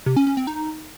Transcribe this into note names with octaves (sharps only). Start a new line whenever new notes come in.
C3
C#4
C#4
C4
D#4